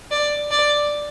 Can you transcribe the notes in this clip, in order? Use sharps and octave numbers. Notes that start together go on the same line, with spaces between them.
D5
D5